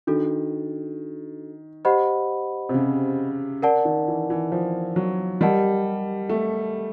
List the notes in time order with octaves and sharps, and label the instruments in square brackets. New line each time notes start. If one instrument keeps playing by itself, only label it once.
[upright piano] D#3 [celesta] D4 F#4 A4
[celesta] G4 C5 D#5 F#5 B5
[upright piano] C3
C#3
[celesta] A#4 D5 F#5 A5
[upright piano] D#3
E3
E3
F3
F#3
[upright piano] G3 [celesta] G4 A#4 D#5 F#5 A5
[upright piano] A3